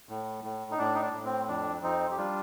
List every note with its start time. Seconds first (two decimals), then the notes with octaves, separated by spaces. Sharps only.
0.09 A2
0.44 A2
0.71 D#4
0.78 A2 D4
0.95 D#4
1.02 D4
1.13 A2
1.24 C4
1.48 F2 D4
1.82 F2 C4 D#4
2.11 G4
2.17 G3 D4 F4